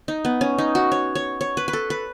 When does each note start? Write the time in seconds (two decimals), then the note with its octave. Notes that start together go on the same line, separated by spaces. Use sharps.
0.08 D#4
0.25 B3
0.41 C#4
0.58 D#4
0.75 F#4
0.92 C#5
1.15 C#5
1.41 C#5
1.57 B4
1.68 B4
1.73 A4
1.90 B4